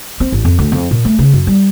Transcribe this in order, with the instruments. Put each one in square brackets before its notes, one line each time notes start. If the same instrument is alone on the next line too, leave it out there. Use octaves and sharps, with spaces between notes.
[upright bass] C4
A1
F2
D2
F2
A#2
A3
C#3
F#2
G3